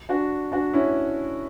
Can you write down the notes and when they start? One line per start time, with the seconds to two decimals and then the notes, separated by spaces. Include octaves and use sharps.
0.09 D4 F#4
0.52 D4 F#4
0.73 C#4 E4